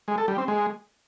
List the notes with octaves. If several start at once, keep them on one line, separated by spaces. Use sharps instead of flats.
G#3
A4
G3
C4
G#3